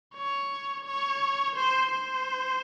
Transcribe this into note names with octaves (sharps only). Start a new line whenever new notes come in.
C#5
C#5
C5
C5